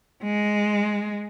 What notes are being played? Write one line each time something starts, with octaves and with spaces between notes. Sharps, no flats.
G#3